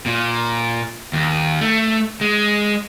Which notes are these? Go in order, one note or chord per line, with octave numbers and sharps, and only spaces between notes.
A#2
D#2
A3
G#3